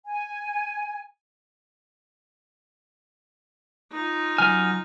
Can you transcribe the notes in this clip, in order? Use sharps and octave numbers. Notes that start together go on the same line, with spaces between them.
G#5
D#4 F4
F#3 G#5 F6